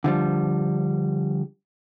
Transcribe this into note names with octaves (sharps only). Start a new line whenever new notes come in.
D3 F3 G3